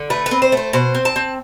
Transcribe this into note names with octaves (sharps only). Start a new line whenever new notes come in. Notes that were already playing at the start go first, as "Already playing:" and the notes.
Already playing: D3
A3 B4
B4
C4
C5
A3 C5
B2 C5
C4
A5
C4